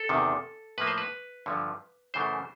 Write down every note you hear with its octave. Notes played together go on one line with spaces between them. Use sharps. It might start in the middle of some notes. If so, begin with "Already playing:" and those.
Already playing: A4
E2 C3 D#3
A2 F3 A#3 B4
C5
B4
G2 D3 F3
F#2 C#3 E3 A3 C5